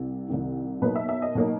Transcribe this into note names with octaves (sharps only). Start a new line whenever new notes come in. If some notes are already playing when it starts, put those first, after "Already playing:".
Already playing: C2 C3
C2 C3 D#3
B2 F#3 A#3 D#4 B4
E5
E5
D#5
B2 F#3 A#3 D#4